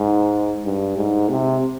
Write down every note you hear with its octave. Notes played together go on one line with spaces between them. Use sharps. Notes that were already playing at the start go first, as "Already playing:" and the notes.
Already playing: G#2
G2
G#2
C3